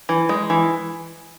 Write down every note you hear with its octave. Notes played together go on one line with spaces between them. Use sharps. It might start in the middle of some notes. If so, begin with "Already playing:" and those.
E3
G#3
E3